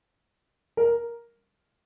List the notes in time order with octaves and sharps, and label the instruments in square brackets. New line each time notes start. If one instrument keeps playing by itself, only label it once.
[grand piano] A#4